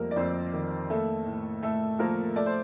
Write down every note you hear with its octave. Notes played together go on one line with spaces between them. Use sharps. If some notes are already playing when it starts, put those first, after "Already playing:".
Already playing: F2 G3 A3 A#3 A#4
D5
F2 C4 C5
D#3
A3 A#3 A4
A2
A2 A3 A4
F3 A#3 A#4
A3 D5
C5